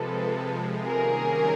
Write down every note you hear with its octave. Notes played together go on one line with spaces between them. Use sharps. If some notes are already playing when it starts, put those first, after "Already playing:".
Already playing: C3 F3 G#3 A4 B4
C3 D#3 G3 A#3 C#4 G#4 A#4